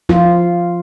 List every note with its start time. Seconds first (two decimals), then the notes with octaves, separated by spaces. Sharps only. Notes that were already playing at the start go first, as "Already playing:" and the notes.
0.09 F3 F4